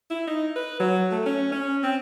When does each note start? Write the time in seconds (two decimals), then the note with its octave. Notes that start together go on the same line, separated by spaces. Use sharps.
0.10 E4
0.27 D#4
0.56 B4
0.80 F#3
1.11 A3
1.26 C#4
1.52 C#4
1.83 C4